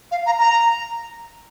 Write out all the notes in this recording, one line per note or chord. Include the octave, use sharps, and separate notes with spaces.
F5
A#5
A#5